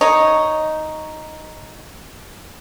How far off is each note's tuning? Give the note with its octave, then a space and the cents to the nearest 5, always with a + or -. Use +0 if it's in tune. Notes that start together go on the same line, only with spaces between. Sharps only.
D#4 +0 C#5 +0